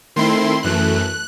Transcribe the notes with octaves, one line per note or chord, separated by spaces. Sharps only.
D#3 A3 C4 E4 C6
F#2 E3 A3 F#6